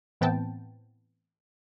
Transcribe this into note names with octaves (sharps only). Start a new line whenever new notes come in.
A2 E3 B3 C4 G5 A5